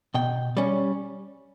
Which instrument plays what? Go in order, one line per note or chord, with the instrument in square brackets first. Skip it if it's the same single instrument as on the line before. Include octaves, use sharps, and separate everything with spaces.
[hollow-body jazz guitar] B2 G5
G3 C#4